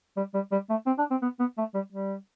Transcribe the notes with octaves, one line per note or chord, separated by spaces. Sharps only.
G3
G3
G3
A3
C4
D4
C4
B3
B3
A3
G3
G3